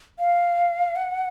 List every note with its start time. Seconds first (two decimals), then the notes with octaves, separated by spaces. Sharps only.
0.19 F5
0.96 F#5